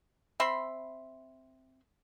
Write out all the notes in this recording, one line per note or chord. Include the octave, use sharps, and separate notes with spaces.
C4 E5 B5 C6